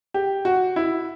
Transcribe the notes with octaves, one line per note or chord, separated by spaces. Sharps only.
G4
F#4
E4